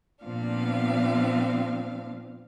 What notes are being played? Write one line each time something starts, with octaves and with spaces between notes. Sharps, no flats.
A#2 F3 B3 C4 D4 F5